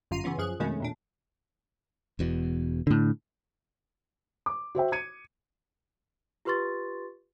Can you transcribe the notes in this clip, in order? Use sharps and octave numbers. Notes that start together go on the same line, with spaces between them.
G1 F#2 F4 A#5 C7 D#7
C#3 E3 B3 C#4 F4
F#2 F3 G#4 F#6
F2 B2 D#3 G#3 A3 C#4
E2 A#2 D4
E1 E2 B2
A2 D3
D6
F#4 C5 E5 G5
G#6 C#7 D#7
F4 G4 B4 C6 C#6 A6